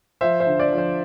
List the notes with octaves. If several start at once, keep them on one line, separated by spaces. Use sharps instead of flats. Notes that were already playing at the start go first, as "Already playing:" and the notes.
F3 C5 E5
C5 E5
D3
D5
F3
C5